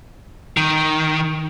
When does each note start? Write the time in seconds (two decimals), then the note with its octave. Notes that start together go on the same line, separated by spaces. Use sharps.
0.57 D#3